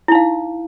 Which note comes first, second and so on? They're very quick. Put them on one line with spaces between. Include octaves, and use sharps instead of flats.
E4 D#4 F5